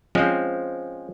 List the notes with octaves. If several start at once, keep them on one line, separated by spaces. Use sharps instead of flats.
F3 G#3 C4 C#4